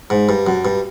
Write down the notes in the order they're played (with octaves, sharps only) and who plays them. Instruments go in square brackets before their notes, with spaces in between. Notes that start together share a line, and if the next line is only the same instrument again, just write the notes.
[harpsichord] G#2
G2
F#2
G2